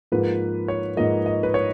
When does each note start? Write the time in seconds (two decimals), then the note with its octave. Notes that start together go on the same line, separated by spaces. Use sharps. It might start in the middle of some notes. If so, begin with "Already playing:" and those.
0.12 G#2 F3 A#3 B4
0.68 C#5
0.97 G#2 F3 A#3 D#5
1.26 D#5
1.43 B4
1.54 C#5